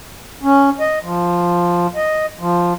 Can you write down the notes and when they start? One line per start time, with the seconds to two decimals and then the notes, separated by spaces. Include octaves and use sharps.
0.43 C#4
0.80 D#5
1.03 F3
1.96 D#5
2.40 F3